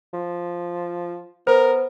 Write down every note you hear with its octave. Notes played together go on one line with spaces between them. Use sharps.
F3
B3 A#4 C5